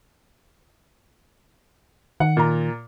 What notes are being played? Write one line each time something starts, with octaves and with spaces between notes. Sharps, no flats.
D#3 F#5
A#2 A#5